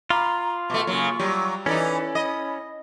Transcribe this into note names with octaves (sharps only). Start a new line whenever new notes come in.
F4 F5 A#5 B5 D6
B2 A3 C#6
C#3 F#3 A#3
F#3 G3 G4
E3 C#4 D#4 E4 A4 B4 D5
D#5 B5